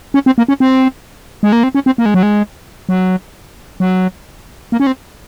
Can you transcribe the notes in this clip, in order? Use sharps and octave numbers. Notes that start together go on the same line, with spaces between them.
C#4
C4
A#3
C#4
C4
G#3
A#3
C4
C#4
C4
A#3
G#3
F#3
G#3
F#3
F#3
A#3
C#4
C4